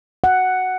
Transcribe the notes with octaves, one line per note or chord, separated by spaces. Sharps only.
F#5